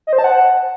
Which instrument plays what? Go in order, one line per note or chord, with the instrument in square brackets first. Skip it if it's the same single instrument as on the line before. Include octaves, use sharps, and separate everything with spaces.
[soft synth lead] D#5
C5
A5
F#5